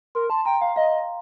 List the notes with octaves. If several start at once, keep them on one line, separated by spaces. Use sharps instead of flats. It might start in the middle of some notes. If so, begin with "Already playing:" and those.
A#4 C6
A5 C6
G5 A#5
F5 G5
D#5 F5